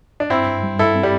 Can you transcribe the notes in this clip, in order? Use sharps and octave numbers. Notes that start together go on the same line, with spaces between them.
D4
G2 C4 E4
G2
G3
G2 E4 A4
C4
G3